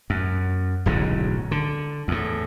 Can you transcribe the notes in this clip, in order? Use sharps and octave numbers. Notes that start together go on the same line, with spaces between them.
F#2
D1 B1 G#2 C#3
D3
E2 A2